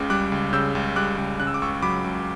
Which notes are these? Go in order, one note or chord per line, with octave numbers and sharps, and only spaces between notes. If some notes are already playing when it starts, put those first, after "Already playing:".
Already playing: C#2 C#3 D6
G3 D6 F#6
C#2
C#3 E6 G6
C#2
G3 D6 F#6
C#2
C#3 F#6
E6
D6
C#2 C#6 E6
F#3 B5 D6
C#2